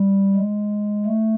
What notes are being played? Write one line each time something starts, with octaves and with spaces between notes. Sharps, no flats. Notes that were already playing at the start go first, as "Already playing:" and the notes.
Already playing: G3
G#3
A3